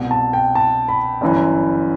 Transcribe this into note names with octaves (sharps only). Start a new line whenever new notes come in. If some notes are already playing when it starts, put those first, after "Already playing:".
Already playing: C2 B2
A5
G5
A5
B5
G1 F#2 E3